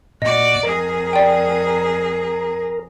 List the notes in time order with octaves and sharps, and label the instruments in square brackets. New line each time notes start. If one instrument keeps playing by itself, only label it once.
[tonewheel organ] A#2 [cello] F#4 D5 [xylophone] D#5
[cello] F2 G#4 [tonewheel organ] A#4 A#5
[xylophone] D5 G5